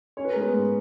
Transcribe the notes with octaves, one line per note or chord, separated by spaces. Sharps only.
C#4 C#5
B4
G#3 A#4
B3 B4
G#2